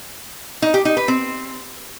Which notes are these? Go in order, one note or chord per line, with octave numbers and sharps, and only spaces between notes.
D#4
G4
D#4
B4
C4